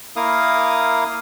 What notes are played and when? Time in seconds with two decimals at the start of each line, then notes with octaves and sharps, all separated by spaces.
0.16 A#3 E4 A#4 F5 D#6